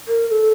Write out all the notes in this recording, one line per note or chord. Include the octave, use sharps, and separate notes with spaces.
A#4
A#4
A4